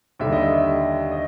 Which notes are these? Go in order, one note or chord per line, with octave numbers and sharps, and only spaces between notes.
D#2 D3 G3 E5
D#5
E5
E5
D#5